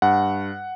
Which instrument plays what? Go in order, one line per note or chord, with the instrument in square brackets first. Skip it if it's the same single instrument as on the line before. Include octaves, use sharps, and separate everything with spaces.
[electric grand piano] G2 F#5